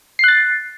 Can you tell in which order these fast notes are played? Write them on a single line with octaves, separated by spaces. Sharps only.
C7 F#6 A6